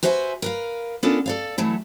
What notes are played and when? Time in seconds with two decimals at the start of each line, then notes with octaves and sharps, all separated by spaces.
0.03 F#4 B4 C5 E5 F#5 G#5
0.42 A#4 B4 F5
1.03 B3 C#4 D4 F4 A4 A#4
1.26 A4 D5 F5
1.58 E3 F#3 A3 E4